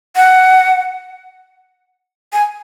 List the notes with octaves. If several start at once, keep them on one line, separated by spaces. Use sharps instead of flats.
F#5
G#5